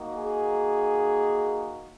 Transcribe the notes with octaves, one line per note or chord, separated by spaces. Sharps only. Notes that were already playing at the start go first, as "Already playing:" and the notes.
Already playing: A#3 D#4 F#4
G#4